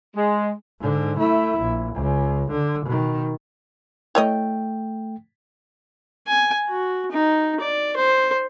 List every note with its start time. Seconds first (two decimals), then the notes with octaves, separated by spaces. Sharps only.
0.16 G#3
0.80 G#2 D3
1.19 A3 E4
1.60 A#1
1.95 C#2
2.51 D3
2.86 B2 D#3
4.15 A3 E4 C#5 D#5 G5
6.27 G#5
6.68 F#4
7.11 D#4
7.60 D5
7.96 C5